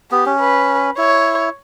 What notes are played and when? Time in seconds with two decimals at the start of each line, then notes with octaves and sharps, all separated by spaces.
0.12 B3 G4
0.26 C#4
0.39 B4
0.98 E4 C#5